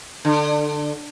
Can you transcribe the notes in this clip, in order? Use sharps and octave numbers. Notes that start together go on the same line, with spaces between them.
D3